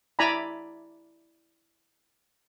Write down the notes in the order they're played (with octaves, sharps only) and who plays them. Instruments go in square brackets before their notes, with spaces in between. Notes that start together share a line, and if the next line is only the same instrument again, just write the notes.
[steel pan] E4 D5 G#5 A#5 B5